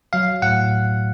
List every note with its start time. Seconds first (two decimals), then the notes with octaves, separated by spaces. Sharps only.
0.13 F#3 F5
0.42 A2 F#5